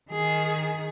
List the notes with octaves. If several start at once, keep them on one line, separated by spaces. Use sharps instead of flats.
D#3 G#4